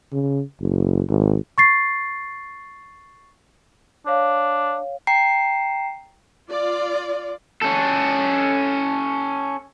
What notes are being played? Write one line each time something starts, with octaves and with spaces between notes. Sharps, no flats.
C#3
F#1
G#1
C#6 A6 C7
D4 C#5 F5
G5 A#5 C7
F4 D5
C#4 A4